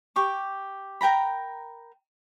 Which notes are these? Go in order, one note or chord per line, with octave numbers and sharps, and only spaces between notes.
G4 C#6 D6
A#4 G5 A#5 B5